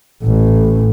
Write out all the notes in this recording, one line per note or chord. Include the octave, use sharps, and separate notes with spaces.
A1 A2